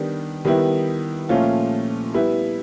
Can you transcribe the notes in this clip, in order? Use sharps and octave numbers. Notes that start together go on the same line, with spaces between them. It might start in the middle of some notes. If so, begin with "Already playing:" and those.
Already playing: D#3 G3 B3 D4
D#3 G3 B3 E4
A#2 F3 A3 C#4 F4
G3 B3 E4